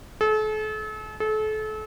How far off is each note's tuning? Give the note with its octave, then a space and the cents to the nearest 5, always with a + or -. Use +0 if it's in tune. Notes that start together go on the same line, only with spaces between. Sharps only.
A4 -40
A4 -35